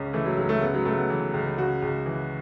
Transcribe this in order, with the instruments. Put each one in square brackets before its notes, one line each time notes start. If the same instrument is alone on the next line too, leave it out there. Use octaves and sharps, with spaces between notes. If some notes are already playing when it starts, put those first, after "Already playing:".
Already playing: [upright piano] C#2 C#3 C#4
E3 A3
F#3
C#2 F#3
A3
C#3 B3
F#3
C#2 A3
B3
E3
C#2
C#3 F#4
C#2
E3